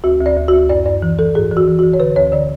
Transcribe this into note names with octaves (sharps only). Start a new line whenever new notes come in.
D2 F#4
D2
D5
D2
D2 F#4
F#2 D5
F#2 D5
E3
E3 A4
G#2 G#4
E3
F#4
E3
E3 F#4
C#5
D3 B4
D2 C#5
D3 D5